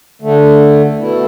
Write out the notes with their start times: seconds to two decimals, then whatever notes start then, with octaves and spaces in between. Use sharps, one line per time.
0.22 D2 D3 A3
0.98 B2 A3 E4